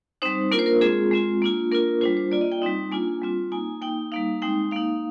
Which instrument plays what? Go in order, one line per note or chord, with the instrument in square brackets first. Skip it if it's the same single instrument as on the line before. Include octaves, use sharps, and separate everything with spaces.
[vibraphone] G3 C4 D#4 C5
A#3 D4 F4 A#4
C5
A#4
G#3 C4 F4 G#4
G#3 C4 F4
A#3 D4 F4
A#3 D4 F4 A#4
G3 D4 F4 C5
C5
A#3 F4 D5
D#5
G5
G3 C4 D#4
A#3 D4 F4 G#5
G3 C4 F4
A#3 D#4 G#5
A#3 D#4 G5
G3 A#3 D#4 F5
G#3 C4 D#4 G5
A#3 D#4 F5